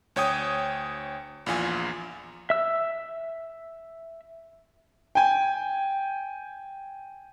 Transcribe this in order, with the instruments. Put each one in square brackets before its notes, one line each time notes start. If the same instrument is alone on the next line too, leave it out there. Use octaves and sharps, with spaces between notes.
[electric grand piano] D2 C#5 G5 D#6
A#1 E2 F4 G#5
[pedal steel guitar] E5 E6
[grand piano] G5 G#5